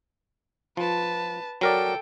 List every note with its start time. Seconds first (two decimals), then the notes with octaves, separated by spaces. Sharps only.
0.77 F3 B4 A5
1.61 F#3 A4 A#4 D5 G5